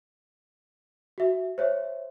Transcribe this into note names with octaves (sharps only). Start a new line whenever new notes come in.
F#4 E5
C5 C#5 E5